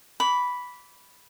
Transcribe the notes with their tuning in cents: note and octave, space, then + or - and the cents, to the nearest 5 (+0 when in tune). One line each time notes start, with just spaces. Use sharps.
B5 +0 D6 -30